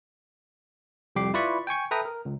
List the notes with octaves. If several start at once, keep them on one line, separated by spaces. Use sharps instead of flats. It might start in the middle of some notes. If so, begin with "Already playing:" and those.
C2 F2 G3 G4 D6 C7
E4 F4 B4 D5 B5 C#6
G5 G#5 C#6 G#6
A4 B4 E5 G5 A#5 D#6
A#4
C#2